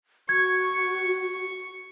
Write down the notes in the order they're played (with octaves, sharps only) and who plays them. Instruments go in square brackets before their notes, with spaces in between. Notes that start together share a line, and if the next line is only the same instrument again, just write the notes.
[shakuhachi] F#4 [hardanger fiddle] C#6 [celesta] G#6